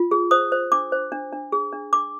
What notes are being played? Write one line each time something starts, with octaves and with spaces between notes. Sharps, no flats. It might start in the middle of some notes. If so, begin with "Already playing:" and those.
Already playing: F4
G#4
C5 D#6
C5
D4 D6
C5
D4
D4
G#4
D4
D4 D6